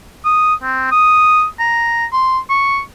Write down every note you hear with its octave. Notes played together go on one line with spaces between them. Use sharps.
D#6
C4
D#6
A#5
C6
C#6